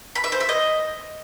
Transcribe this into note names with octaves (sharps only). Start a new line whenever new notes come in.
B5
E5
C5
E5
D#5